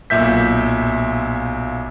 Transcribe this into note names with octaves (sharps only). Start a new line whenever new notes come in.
B1 A#2 E5 G6 B6